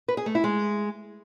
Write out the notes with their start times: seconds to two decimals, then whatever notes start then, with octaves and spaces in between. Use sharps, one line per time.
0.08 B4
0.17 G#4
0.26 A3
0.35 E4
0.44 G#3